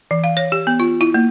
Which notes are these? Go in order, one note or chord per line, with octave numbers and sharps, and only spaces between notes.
E3
F5
C#5
G4
B3
F4
E4
A#3